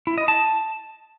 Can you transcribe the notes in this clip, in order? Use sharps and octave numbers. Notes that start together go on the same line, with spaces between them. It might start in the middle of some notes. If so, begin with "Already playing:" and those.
E4
D#5
A5